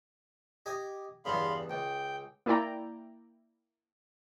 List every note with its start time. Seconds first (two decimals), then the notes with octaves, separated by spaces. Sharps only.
0.66 G4 D#5 G#5
1.25 E2 G2 C#3 F5 B5 C6
1.70 C#2 G5
2.46 A#3 E4 D5 G5 A#5